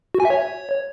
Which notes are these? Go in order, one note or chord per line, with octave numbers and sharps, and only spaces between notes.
F#4
G#5
E5
C#5